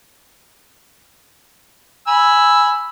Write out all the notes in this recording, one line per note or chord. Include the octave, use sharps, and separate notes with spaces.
G#5 B5 E6